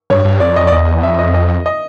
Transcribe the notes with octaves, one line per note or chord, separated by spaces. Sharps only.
G2 C#5
G2
F2 D5
D#5
D5
E2 D#5
F2 E5
D#5
D#5
D#5